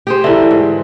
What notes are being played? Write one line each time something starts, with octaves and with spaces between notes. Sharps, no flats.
G4 G#4 C5
D3 E3 E4 E5
G#2